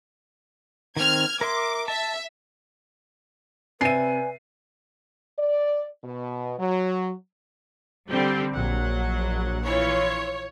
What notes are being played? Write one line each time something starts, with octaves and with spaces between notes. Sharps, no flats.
D#3 C4 F6 G#6
A#4 E5 C6 D6
E5 A5
C3 B4 D5 E5 G#5 C7 D#7
D5
B2
F#3
D3 G3 C4 G4
A#1 F#3 F#5
E3 F4 C#5